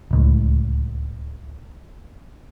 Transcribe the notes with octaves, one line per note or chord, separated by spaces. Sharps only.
D1 C#2 A2